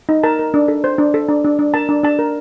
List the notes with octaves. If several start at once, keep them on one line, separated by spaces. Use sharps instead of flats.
D#4
A#4 A5
A#4
D4
A4
C5
D4
A4
D4
D4
D4
A#4 A5
D4
D4 A5
A#4